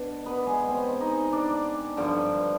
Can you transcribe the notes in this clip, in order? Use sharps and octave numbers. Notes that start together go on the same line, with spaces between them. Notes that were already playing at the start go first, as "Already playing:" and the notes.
Already playing: B2 D4 D5
B3 B4
G#3 G#4
C4 C5
D#4 D#5
D4 D5
G2 D3 F3